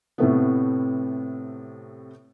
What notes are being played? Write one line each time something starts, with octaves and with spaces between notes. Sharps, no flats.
A2 C3 A3 B3